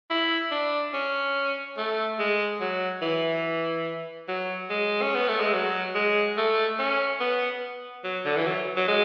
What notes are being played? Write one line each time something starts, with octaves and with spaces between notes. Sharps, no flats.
E4
D4
C#4
A3
G#3
F#3
E3
F#3
G#3
C#4
B3
A3
G#3
F#3
G#3
A3
C#4
B3
F#3
D3
E3
F#3
F#3
G#3